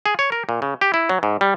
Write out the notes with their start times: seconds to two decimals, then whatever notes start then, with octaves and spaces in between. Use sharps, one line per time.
0.06 G#4
0.19 C#5
0.32 A#4
0.49 A#2
0.62 C#3
0.81 G4
0.94 E4
1.09 F#3
1.23 G#2
1.41 G3